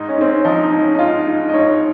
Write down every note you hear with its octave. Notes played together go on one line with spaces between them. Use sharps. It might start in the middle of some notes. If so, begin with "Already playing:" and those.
Already playing: G#2 D#4
C#4
G#2 C4
C#4
F3 D#4
D#4
G#2
C#4
D#4
G#2 F4
G#2
D#5
G#2 C#5